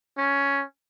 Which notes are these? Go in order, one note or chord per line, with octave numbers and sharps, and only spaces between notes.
C#4